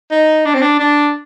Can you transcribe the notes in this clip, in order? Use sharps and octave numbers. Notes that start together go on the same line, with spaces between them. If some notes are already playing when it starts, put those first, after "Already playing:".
D#4
D4
C4
D4
D4